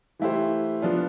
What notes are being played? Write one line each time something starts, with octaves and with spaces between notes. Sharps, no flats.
E3 A3 E4 G4 C5
F3 B3 D4 F4